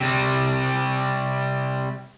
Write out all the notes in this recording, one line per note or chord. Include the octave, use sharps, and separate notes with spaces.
C3 G3